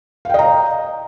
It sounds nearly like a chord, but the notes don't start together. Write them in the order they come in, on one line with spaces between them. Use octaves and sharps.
F5 G5 D#5 A#5